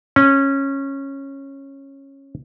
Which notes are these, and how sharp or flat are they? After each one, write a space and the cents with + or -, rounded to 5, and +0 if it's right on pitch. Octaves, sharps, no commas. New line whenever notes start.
C#4 -15